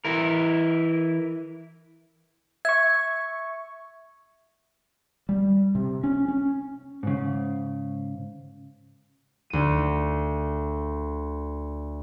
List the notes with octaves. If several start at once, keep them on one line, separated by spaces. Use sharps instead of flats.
E3 E4 A#4
E5 C#6 G#6
G3
C3
C#4
C#4
G#2 C#3
D2 D#7